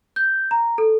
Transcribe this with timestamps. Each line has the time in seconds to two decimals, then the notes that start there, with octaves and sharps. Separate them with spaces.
0.16 G6
0.51 A#5
0.78 A4